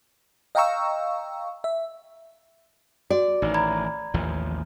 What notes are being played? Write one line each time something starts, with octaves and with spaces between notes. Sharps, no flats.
D#5 F5 G5 A#5 C#6 E6
E5
F#4 D5
A1 D#3 D#4
A#5 B5 G#6
A1 D#2 F3